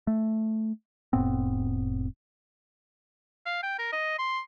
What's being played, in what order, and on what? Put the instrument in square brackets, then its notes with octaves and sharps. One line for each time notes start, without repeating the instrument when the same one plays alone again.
[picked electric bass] A3
F1 A2 B3 C4
[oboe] F5
G5
A#4
D#5
C6